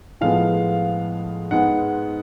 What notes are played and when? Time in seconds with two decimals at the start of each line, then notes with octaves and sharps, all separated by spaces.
0.21 A2 F3 G#3 B3 F5
1.51 G#2 G#3 B3 F#5